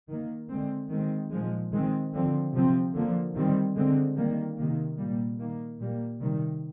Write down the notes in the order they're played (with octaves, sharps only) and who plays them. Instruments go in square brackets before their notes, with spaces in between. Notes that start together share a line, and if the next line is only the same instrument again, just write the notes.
[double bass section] D#3 A#3
D3 G#3 C4
D#3 G#3 C4
A#2 F3 G#3
D#3 G#3 C4
D3 F3 C4
C3 F3 C4
D3 F3 A#3
D#3 G3 C4
D3 G#3 C4
D#3 G3 A#3
C3 D#3 A#3
A#2 G3 A#3
D#3 A#3
A#2 G3 A#3
C3 D#3 G3